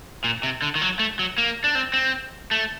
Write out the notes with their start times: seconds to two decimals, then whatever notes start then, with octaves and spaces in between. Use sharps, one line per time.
0.24 A#2
0.43 C3
0.62 D3
0.75 D#3
0.82 F#3
0.99 A3
1.19 F#3
1.38 A#3
1.64 D4
1.75 C4
1.94 C4
2.51 A3